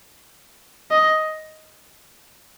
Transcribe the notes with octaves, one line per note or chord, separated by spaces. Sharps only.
D#5